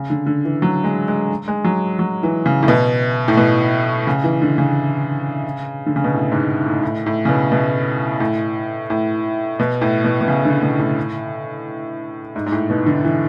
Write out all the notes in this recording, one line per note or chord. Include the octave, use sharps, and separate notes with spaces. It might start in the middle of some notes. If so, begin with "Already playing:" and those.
Already playing: C#3
D3
D3
E3
F#3
G#3
G#3
G#3
F#3
F#3
E3
C#3
A2
B2
A2
B2
C#3
E3
D3
C#3
D3
C#3
B2
A2
G#2
A2
A2
A2
C#3
B2
B2
A2
A2
B2
A2
B2
B2
C#3
D3
B2
A2
G#2
G#2
A2
B2
D3
E3